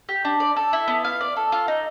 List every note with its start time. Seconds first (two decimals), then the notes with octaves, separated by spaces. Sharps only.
0.09 G4
0.25 D4
0.40 D5
0.56 A4
0.73 E4
0.88 B3
1.04 F5
1.21 D5
1.36 A4
1.52 F4
1.68 D#4